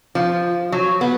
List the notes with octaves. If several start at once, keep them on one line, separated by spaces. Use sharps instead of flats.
F3
F#3
B3